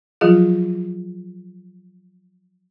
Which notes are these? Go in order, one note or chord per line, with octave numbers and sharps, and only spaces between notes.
F3 F#3 F4 G#4